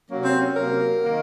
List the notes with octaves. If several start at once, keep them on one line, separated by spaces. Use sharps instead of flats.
C3 F#3 A#3 C#4
C#4
C4
C#4
C3 F#3 A#3 A#4
D#3 A#3